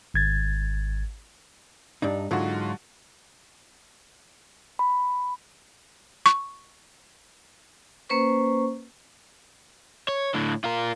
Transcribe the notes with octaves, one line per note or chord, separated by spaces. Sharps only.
G#1 G#6 A6
G2 D4 D#4
G#2 D3 F#3 F4 F#4
B5
C#6
A#3 C#4 B4 C5 C#6
C#5
A2 D3
F4 A#4